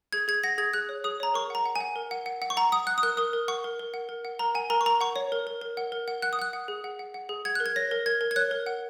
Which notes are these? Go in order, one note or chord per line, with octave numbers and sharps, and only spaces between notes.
G#4 G#6
G#4 G#6
F#5 A#6
G#4 G#6
G#4 F#6
C#5
G#4 D#6
C#5 A#5
A#4 C#6
F#5 A#5
F#5
G#5
F#5
A#4
F#5
F#5
F#5
C#6
F#5 A#5
F#5 D#6
F#5 F#6
D#6
A#4 F#6
A#4 D#6
A#4
F#5 C#6
A#4
A#4
F#5
A#4
F#5
A#4 A#5
F#5 G#5
A#4 A#5
C#6
A#4 A#5
F#5 C#6
C#5
A#4
A#4
A#4
F#5
A#4
F#5
F#5 F#6
D#6
F#5 F#6
F#5
G#4
F#5
F#5
F#5
G#4
F#5 G#6
A#4 F#6
G#6
C#5 A#6
A#4
A#4 G#6
A#4
G#6
C#5 F#6
A#4
F#5